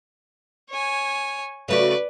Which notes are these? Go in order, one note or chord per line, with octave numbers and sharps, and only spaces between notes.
C#5 G#5
C#3 A3 F#4 B4 D5